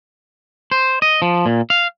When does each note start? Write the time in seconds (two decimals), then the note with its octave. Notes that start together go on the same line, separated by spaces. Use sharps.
0.71 C5
1.02 D#5
1.22 F3
1.46 A#2
1.70 F5